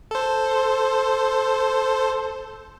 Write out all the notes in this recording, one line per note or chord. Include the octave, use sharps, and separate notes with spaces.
A4 C5